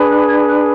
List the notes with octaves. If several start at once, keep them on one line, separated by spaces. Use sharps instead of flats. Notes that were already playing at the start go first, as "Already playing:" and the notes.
Already playing: D4 G#4 B4
F#6
G#6
F#6